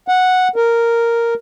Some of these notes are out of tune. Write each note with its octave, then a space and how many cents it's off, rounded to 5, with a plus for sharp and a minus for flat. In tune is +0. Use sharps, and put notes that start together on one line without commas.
F#5 -5
A#4 -5